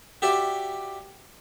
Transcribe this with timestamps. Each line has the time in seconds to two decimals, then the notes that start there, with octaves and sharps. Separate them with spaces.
0.22 F#4 G4 D5 E5